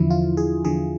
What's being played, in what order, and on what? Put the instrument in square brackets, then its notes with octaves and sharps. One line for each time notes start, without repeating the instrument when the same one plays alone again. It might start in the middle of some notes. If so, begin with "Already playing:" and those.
Already playing: [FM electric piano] E2 D3 F3 E4
F4
G#4
E2 D3 F3 G#4